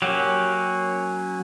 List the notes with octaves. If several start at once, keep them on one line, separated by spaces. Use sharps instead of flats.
F#3 A#3 C#4 G4